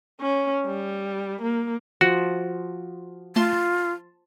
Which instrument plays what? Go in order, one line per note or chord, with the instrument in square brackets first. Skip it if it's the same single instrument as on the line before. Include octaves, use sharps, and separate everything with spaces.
[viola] C#4
G3
A#3
[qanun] F3 [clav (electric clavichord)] F#4
[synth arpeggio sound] A3 [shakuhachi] F4 [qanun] A5 C6